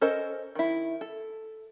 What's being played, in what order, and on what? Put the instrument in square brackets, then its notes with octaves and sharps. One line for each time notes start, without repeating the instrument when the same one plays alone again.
[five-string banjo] C#4 A4 A#4 C5 D#5
D#3 E4
A4